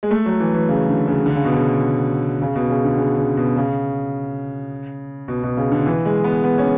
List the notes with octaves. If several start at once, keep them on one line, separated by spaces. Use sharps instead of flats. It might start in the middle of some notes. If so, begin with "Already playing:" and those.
G#3
A3
F#3
E3
E3
C#3
D3
C#3
D3
C#3
B2
C#3
C#3
B2
C#3
D3
C#3
C#3
B2
C#3
B2
B2
C#3
D3
E3
G#3
B3
B3
C#4